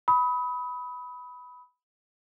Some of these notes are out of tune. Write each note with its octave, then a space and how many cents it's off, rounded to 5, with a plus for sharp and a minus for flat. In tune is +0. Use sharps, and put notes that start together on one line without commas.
B5 +0 D#6 +35